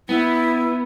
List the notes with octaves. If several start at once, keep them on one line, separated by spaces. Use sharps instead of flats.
B3 E4